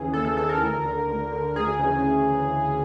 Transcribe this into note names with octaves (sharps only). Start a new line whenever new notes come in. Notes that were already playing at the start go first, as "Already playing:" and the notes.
Already playing: D#2 C#3 E3 G#4
D#2 A4
A4
C#3 E3 A4
A#4
D2
D3
D2
D3
D2 G#4
C#3 E3